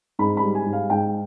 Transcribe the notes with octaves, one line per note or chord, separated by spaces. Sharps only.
G#2 B5
B5
G3
G#5
G#2
F5
G#2 G5